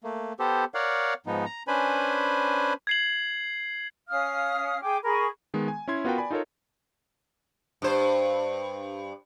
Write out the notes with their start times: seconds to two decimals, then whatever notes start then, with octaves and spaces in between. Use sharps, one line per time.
0.04 A3 A#3
0.39 B3 G4 A4 C5
0.74 A#4 C#5 D5 F5 F#5
1.26 G#2 F3 B3 D#4
1.46 A#5
1.68 C#4 D4 B4 C5 G#5 B5
2.87 G#6 C7 F#7
4.08 C#4 F5 D#6 F6
4.81 G#4 G5 D6
5.03 G#4 A#4 B5 C#6
5.54 D#3 G#3 B3
5.68 G#5
5.88 C#4 E4 C6 G#6
6.05 B3 F4 F#4 A#4 B4 G5
6.18 D5 G#5 B5
6.31 D#4 F4 A4 A#4 C#5
7.82 G2 C5